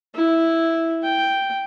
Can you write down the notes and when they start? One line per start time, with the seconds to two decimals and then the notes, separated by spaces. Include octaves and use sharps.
0.15 E4
1.03 G5